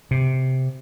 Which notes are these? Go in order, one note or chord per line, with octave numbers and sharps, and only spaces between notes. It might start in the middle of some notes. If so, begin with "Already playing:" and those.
C3